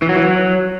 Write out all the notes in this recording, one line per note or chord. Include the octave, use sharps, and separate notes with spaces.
E3
F#3
E3
F#3